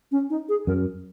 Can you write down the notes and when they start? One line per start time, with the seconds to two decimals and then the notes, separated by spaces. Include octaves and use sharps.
0.12 C#4
0.30 D#4
0.49 G#4
0.67 F#2 A#4